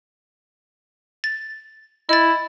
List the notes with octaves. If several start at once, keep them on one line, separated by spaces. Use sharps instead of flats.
A6
E4 D#5 A6